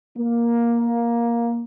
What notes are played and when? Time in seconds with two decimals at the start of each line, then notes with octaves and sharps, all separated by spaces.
0.17 A#3